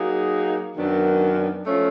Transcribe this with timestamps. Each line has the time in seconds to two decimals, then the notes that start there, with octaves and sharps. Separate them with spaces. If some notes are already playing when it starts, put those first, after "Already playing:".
Already playing: F#3 A#3 D#4 G#4
0.77 F#2 D#3 F#3 B3 D4
1.66 F3 A3 C#4